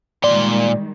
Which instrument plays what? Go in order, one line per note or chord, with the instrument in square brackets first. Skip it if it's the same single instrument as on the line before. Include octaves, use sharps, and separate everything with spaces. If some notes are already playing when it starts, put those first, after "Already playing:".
[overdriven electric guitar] A#2 C6 [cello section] D#3 G3 G#3 [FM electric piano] D5